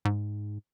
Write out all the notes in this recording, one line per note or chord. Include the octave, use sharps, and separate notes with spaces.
G#2